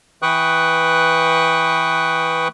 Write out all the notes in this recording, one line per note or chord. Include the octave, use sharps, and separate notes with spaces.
E3 B4 G5 C#6 D#6 F#6